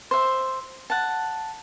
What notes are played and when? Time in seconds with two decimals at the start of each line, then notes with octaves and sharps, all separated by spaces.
0.11 C5 E5
0.90 F#5 A5